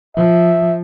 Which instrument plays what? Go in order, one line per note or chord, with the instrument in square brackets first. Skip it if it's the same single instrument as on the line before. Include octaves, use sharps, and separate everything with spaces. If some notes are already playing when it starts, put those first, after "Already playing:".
[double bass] F3 [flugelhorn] E5